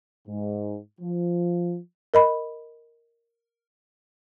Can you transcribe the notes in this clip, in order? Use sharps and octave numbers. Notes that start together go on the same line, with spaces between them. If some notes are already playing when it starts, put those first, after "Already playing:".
G#2
F3
A#4 D#5 B5